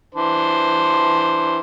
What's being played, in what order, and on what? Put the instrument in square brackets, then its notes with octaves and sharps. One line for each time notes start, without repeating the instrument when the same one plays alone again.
[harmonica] E3 D4 C5